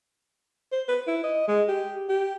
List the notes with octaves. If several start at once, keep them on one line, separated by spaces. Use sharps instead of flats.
C5
B4
E4
D#5
G#3
G4
G4